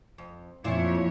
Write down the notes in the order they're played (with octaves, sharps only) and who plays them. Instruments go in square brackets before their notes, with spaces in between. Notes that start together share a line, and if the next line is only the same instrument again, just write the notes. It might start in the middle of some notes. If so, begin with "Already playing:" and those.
[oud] F2
[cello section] F2 C#5 [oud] A#2 E4 F4